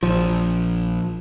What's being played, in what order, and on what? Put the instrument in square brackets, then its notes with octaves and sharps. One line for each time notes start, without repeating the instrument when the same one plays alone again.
[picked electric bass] A#1 [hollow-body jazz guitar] F3